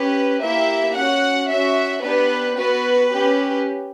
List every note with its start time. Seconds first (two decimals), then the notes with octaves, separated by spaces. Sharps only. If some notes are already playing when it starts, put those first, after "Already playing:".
Already playing: C#4 G4 B4
0.41 A#3 E4 G4 E5
0.95 C#4 F#4 F#5
1.49 C#4 F#4 E5
2.03 B3 D4 G4 B4
2.57 B3 F#4 B4
3.11 C#4 G4